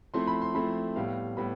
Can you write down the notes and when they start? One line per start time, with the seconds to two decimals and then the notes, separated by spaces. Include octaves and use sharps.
0.14 F3 A3 C4 E4 C6
0.27 B5
0.42 C6
0.54 F3 A3 C4 E4 B5
0.96 A2 G3 B3 F5
1.37 A2 G3 B3 B5